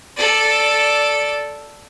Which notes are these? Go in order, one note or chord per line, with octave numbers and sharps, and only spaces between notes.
A4 D5